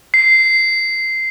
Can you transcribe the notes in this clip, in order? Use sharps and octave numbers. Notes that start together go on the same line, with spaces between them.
C7